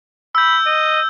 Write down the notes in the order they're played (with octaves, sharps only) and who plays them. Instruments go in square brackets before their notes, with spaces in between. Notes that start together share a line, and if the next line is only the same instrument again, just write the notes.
[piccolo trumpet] B5 [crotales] E6 G6
[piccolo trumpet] D#5